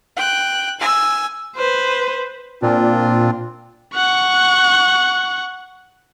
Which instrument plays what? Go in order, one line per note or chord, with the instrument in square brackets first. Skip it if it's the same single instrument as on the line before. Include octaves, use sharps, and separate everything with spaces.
[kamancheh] G5 F#6
G#5 E6
[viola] B4 C5
[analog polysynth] A#2 [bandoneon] C4 D4 F4
[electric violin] F#5 C#6